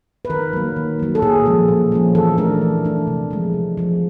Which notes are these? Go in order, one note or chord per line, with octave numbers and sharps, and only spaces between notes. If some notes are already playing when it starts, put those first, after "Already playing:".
B4
D#3 A#4
F#3 A#3
D#3
F#3 A#3
A4
A#2 G#4
F3 G#3 C#4
A#2
F3 G#3 C#4
E3 A4
A3 D4 A#4
E3
A3 D4
C3
F3 G#3
C3
F3 G#3